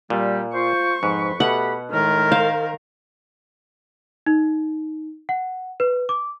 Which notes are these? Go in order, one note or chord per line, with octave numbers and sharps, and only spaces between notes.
A#2 G3
F4 C5 C#6
F2 G#2 F3 B4
B2 A3 G4 F#5 B5
A2 D#3 G#3 A#4 F6
C5 F5
D#4
F#5
B4
D6